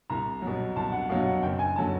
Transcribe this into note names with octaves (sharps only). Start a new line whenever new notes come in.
C2 A#5
B2 F#3
C2 A5
F#5
B2 F#3 F5
F#5
F#1 G5
G#5
D3 F#3 A5